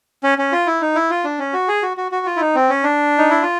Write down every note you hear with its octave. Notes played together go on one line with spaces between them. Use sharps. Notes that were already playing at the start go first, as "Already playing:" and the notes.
C#4
C#4
F4
E4
D#4
E4
F4
D4
C#4
F#4
G#4
F#4
F#4
F#4
F4
E4
D#4
C4
C#4
D4
D#4
E4
F4